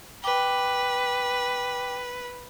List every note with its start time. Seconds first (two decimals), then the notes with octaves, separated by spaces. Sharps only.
0.24 B4 G5 D6